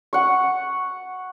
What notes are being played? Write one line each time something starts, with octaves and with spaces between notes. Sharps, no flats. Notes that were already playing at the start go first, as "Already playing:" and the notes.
F#5 C#6